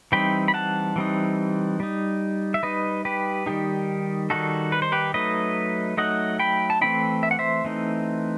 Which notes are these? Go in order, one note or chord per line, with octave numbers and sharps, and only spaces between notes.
E3 G3 C4 D#4 G5 B5
B5
F#5 A5
E3 G3 C4 D#4
G3 D#4
E5
G3 D#4 B4 D#5
G4 B4
D#3 G3 D#4 G4
D#3 G3 D#4 F#4 A4
B4
C5
G4 B4
F#3 A3 D#4 B4 D#5
F#3 A3 D#4 D#5 F#5
G5 B5
A5
E3 A3 C4 D#4 G5 B5
E5
F#5
C5 E5
E3 A3 C4 D#4